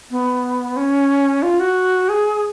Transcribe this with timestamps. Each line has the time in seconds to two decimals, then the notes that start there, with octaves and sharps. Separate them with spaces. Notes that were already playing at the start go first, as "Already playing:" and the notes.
0.11 B3
0.77 C#4
1.43 F4
1.60 F#4
2.09 G#4